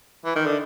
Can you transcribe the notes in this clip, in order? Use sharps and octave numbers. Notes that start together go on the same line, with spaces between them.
E3
D#3
D3